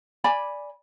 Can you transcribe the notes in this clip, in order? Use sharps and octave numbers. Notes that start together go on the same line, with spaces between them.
D5 G#5 B5